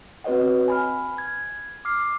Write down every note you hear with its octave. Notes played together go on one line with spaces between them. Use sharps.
C4 F#4 B4 C#5 D#5 F#5
G#5 B5 F6
G#6
D6 F6 C7